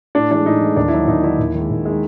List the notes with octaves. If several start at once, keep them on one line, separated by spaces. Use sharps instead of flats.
A2 D4
E3 G#3 D4
A2 D#4
E3 G#3
D#2 D4
E4
D3 F#3 D#4
D#2 D#4
D3 F#3 E4
D#2
D#3 G#3
D#2
D#3 G#3